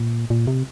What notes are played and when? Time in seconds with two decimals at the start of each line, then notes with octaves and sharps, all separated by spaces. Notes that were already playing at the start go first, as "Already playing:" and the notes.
Already playing: A#2
0.30 A#2
0.47 C3